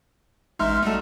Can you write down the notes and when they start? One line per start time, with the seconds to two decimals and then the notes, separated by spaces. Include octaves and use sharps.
0.59 A1 G#3 D#4 E5 C6 F6
0.82 G3 A3 D#4 F#4 A4